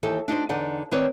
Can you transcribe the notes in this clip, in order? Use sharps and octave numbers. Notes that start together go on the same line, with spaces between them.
D#2 E3 D#4 G4 A4
D4 D#4 F#4 C5
E2 D3 D#4 D5 F#5
D#3 C4 B4 C#5 D5